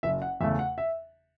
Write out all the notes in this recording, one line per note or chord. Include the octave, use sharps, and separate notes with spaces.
F#1 E5
F#5
E2 C#3 A3 E5
F#5
E5